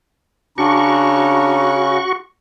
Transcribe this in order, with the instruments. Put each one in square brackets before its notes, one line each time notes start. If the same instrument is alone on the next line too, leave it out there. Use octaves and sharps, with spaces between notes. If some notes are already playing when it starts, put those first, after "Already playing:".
[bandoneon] C#3 C#4 [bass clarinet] D4 [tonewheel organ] F#4 C#6 [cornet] A#5